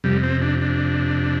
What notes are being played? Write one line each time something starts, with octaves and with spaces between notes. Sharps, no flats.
F2 C3 G3
C4
D4
D4